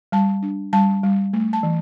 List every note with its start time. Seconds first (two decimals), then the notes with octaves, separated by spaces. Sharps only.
0.12 G3 A5
0.42 D4
0.73 G3 A5
1.03 G3
1.33 A3
1.53 A5
1.63 E3